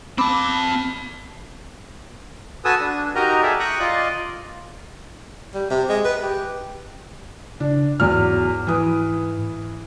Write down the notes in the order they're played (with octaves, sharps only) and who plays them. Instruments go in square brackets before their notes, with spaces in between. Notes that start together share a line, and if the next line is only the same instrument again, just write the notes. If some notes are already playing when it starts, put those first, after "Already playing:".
[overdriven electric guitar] C4 A5 [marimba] B5 D6
[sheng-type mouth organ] F#4 A4 B4 G#5 D#6 E6
D4
D#4 F#4 G4 A#4 D#5 A#5
G#4 A4 D5 E5
G5 A#5 C#6 D#6 F#6
F4 D5 D#5
[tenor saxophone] G3
C3
G#3
B4
G4
[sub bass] C#3 [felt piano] D4
[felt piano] E2 F#3 F6 [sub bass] G#2
[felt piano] E3 B4 D#6